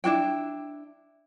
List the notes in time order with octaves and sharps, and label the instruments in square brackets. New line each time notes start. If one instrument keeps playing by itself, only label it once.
[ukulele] D4 E4 F#4 G5